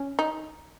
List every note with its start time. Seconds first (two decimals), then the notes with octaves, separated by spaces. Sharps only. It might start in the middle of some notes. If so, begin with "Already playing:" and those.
Already playing: C#4
0.19 D#4